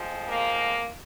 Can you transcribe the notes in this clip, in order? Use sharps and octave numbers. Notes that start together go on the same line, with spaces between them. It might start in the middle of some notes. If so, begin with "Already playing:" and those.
Already playing: F2 F3 G#3
A#3